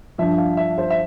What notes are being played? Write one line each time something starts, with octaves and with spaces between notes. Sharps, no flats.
G2 F3 E5
F5
E5
C5
E5